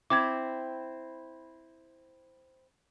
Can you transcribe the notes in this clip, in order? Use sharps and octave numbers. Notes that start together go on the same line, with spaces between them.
C4 E4 D6 G#6